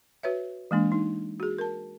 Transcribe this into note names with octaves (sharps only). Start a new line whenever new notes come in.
F#4 B4 C#5 E5
E3 G#3 A#3 D4
D#4
F#4 G#4
A#4 A5